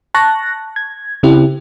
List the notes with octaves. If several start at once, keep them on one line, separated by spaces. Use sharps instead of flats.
A5 C#6 F#6 A#6
G#6
C#3 C4 E4 G4